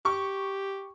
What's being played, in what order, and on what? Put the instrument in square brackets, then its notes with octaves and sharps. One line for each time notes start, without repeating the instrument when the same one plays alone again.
[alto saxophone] G4 [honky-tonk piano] C#6